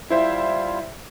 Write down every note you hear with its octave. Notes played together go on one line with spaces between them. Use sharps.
G3 E4 F4 C5 E5